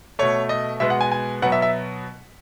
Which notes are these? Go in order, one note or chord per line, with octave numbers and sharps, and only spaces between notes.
B2 A3 C#5
D#5
B2 G#3 B3 E5
F#5
G#5
G#5
B2 F#3 B3 F#5
E5
E5